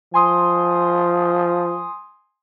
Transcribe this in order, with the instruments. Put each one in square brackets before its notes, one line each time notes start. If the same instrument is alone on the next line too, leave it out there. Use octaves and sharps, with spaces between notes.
[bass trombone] F3 [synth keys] G#5 C6 D#6